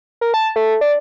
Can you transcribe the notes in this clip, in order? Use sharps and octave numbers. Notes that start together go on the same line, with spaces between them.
A#4
A5
A3
D4